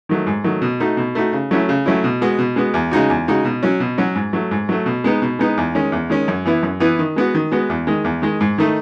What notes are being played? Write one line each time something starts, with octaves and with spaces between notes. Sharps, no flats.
D#3 F#3 A3
G#2
D#3 F#3 A3
B2
A3 D#4 F#4
B2
A3 D#4 F#4
C#3
F#3 A3 C#4 E4
C#3
F#3 A3 C#4 E4
B2
G#3 B3 F#4
B2
G#3 B3 F#4
E2
C#3 G#3 D#4 F#4
E2
C#3 G#3 D#4 F#4
B2
F#3 C#4 F#4
B2
F#3 C#4 F#4
G#2
F#3 A3
G#2
F#3 A3
B2
G#3 B3 D#4
B2
G#3 B3 D#4
E2
D#3 G#3 C#4
E2
D#3 G#3 C#4
F#2
E3 B3 E4
F#2
E3 B3 E4
D#3
G#3 B3 F#4
D#3
G#3 B3 F#4
E2
D#3 G#3
E2
D#3 G#3
G#2
D#3 A3 D#4